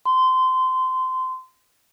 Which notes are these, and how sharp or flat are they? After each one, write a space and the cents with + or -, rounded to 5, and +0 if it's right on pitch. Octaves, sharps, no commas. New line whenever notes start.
C6 -20